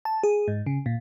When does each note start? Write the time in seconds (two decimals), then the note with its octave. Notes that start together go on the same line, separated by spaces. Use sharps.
0.05 A5
0.23 G#4
0.48 G#2
0.66 C#3
0.86 A#2